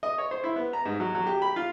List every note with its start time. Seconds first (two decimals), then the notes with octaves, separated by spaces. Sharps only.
0.03 D#5
0.18 C#5
0.31 C5
0.44 E4
0.56 B3
0.73 A#5
0.85 G#2
1.00 F#3
1.15 F#3
1.26 G4
1.42 B5
1.56 F4